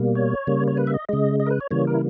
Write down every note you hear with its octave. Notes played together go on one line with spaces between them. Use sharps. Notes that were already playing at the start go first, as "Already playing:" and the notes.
Already playing: B2 G3 A#3
C#5
C#3 G3 A#3
C#5
B4
E5
D#5
C#3 G#3 D#5
D#5
A#4
B4
C#5
C#3 E3 G3 A#3 C#5
A#4
E4